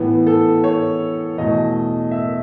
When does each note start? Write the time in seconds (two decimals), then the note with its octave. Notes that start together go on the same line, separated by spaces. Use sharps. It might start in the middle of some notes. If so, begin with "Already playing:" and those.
Already playing: A2 E3 B3
0.27 A4
0.64 C#5
1.38 E2 B2 A3 D#5
2.11 E5